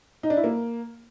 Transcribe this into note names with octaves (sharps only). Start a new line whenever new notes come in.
D#4
D4
E4
A#3